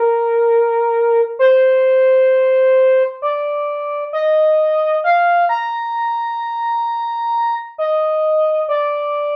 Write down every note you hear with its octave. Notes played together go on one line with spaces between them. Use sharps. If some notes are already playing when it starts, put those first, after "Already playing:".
Already playing: A#4
C5
D5
D#5
F5
A#5
D#5
D5